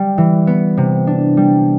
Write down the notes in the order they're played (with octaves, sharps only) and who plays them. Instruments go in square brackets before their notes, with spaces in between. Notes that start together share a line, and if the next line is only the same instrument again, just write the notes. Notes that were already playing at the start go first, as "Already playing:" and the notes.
Already playing: [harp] G3
E3
B3
C3
D4
G3